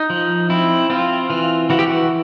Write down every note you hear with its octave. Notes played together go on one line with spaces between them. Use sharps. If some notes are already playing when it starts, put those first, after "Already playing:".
Already playing: D#4
F3
C4 E4
C4 F4
E3 F4
E3 F#4
G4
F#4